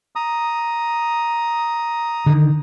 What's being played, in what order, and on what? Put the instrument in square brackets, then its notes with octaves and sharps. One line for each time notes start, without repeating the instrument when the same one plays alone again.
[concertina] A#5 D#6
[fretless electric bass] D3 D#3